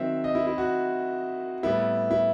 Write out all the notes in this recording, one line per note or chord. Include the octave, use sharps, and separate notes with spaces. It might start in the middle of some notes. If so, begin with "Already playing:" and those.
Already playing: D#3 F#3 C4 E5
D#5
E4
E4
F#4
A2 G3 B3 E4
E4